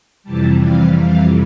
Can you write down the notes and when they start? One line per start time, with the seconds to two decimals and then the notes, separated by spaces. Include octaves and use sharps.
0.23 F2 C3 E3 G3 A5
0.60 F5
0.95 F5